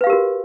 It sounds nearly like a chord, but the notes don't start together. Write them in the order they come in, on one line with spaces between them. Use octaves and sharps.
B4 F5 G4 A#4 F#4